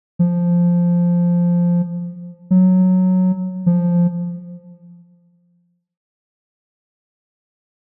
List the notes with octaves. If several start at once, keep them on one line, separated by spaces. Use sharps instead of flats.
F3
F#3
F3